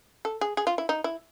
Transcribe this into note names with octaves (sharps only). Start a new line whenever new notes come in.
A4
G#4
G#4
F4
E4
D#4
E4